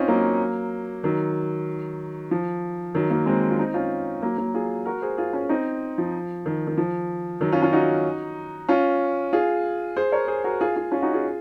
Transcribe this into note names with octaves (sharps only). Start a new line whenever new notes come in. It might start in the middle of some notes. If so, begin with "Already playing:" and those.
Already playing: C4 C#4 D#4 F4
F#3 A#3
D#3 F#3
F3
D#3 F#3
F#3 A#3
G#3 C4
F4
C4 D#4
C#4 F4
F#3 A#3
F#3 A#3
F4 G#4
F#4 A#4
G#4 C5
F4 G#4
C#4 F4
C4 D#4
F3
D#3
D#3
F3
D#3 F#3
C#4 F4
C#4 F4
D#4 F#4
C#4 F4
F4 G#4
G#4 C5
A#4 C#5
G#4 C5
F#4 A#4
F4 G#4
F4 G#4
C#4 F4
D#4 F#4
F4 G#4